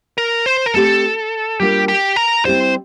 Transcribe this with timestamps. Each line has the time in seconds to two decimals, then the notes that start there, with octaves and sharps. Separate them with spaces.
0.18 A#4
0.46 C5
0.66 A#4
0.74 A3 C4 G4 A4
1.60 G3 A#3 D4 F4 G4
1.88 G4
2.16 A#4
2.45 G3 C4 E4 G4 C5 D5